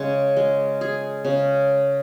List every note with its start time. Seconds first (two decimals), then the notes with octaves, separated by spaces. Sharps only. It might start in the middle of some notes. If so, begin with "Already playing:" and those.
Already playing: C#3 G#3
0.37 G#3
0.81 G#4
1.25 C#3